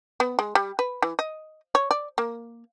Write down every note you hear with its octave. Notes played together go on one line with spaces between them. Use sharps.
B3
G#3
G3
B4
E3
D#5
C#5
D5
A#3